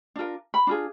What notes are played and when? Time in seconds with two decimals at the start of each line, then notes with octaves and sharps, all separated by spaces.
0.16 D4 F4 A#4
0.54 B5
0.67 D4 F4 G#4